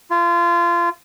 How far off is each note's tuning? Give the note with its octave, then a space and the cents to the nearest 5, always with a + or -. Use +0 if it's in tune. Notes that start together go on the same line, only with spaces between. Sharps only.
F4 -25